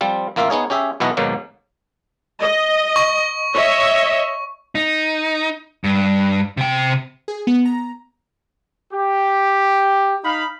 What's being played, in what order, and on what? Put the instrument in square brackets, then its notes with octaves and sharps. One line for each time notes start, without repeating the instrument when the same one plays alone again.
[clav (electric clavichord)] F3 G3 C4 F4
A1 A#3 F4 E5 F5
B3 D#4 G#4 C#5
C#4 G4 G#4 E5
B1 B2 E3 B3 F#4 D#5
D#2 G#2 B2 F#3 A#3
[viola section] D#5
[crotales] C#6
[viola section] C#5 D#5 E5
[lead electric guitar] D#4
G2
C3 G5
[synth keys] G#4
B3
A#5
[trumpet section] G4
D#4 F5 B5